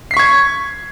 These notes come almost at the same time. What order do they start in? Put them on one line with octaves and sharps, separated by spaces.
C7 B6 C#6 G#6